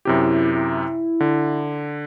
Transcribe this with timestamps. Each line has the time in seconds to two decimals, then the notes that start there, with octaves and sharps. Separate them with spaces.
0.05 F#2 C3 E4 G4
0.54 E4
1.20 D3